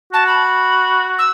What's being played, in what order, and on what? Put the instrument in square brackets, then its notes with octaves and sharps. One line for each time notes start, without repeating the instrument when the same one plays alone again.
[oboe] F#4 [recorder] A5
[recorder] B5
E6